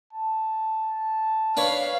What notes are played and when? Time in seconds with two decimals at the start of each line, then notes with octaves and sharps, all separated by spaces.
0.13 A5
1.57 D4 B4 C#5 F5